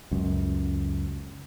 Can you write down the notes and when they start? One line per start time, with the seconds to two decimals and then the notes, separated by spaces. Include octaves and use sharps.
0.11 C#2 F#2